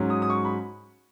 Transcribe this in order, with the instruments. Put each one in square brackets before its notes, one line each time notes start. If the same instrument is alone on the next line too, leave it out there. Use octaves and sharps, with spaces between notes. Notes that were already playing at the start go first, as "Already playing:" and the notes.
Already playing: [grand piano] G#2 F#3 C#4
D#6
D#6
C#6
B5